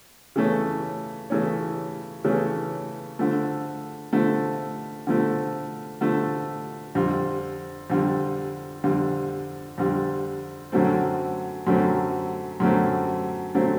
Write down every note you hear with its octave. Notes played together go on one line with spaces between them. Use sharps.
C#3 E3 A3 C#4
C#3 E3 A3 C#4
C#3 E3 A3 C#4
D3 F3 A3
D3 F3 A3
D3 F3 A3
D3 F3 A3
F2 D3 G3
F2 D3 G3
F2 D3 G3
F2 D3 G3
F#2 D3 F#3 A3 C4
F#2 D3 F#3 A3 C4
F#2 D3 F#3 A3 C4
D3 F#3 A3 C4